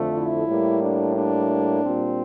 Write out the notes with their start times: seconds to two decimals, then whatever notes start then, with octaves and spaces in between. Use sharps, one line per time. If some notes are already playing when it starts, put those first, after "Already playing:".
Already playing: F2 D3 F3 A3
0.13 E4
0.47 A2 G3 A#3
0.80 D4
1.15 D4
1.82 A#2 G3 C4